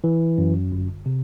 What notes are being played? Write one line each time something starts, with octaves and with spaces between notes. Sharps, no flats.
E3
F#2
G1
C3